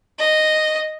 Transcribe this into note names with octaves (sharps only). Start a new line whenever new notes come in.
D#5